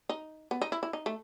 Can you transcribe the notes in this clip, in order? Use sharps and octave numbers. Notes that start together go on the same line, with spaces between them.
D#4
B3
D#4
E4
E4
D#4
A3